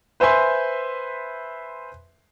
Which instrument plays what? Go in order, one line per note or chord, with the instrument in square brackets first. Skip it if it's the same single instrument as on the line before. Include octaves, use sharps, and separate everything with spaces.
[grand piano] B4 C5 E5 G#5 C6